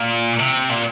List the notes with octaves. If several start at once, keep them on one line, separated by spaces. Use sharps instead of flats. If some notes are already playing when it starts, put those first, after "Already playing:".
Already playing: A#2
C3
A#2